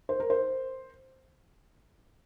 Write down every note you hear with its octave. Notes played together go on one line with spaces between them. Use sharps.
C5
A#4
C5